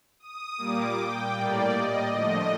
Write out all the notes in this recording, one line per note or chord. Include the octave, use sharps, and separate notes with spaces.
D#6
A#2 G3 A#3 D6
G5
A2 G3 A#3 D5
D#5
D3 F3 A3 D#5